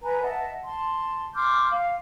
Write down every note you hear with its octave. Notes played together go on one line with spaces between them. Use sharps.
B4 G#5 A#5
D#5 E5 F#5 A5
A5 C6
C6 D6 F6 G6
F5